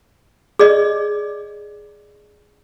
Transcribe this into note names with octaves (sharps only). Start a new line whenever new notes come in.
G#4 D5 D#5